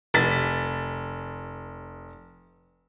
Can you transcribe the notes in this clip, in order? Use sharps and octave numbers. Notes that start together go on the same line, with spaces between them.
F1 A6 B6